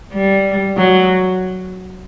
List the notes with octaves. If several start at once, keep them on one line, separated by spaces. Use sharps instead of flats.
G3
F#3